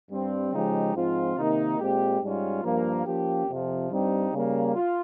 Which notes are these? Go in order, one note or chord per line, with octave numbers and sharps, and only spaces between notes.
G2 G3 C4
C#3 F3 G#3 D#4 G4
G#2 F3 C4 F4
C3 D#3 A#3 D#4
A#2 G#3 C4 G4
G#2 G3 C#4 F4
G2 F3 A#3
F3 A#3 C#4 G4
F2 C3 F3
G2 G3 C4 D#4 G4
C#3 G3 A#3
F4